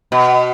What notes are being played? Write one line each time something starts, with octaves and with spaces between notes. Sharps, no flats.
B2